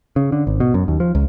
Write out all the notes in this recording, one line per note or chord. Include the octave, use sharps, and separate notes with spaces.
C#3
D3
G#1
B2
F#2
D#2
F3
C#2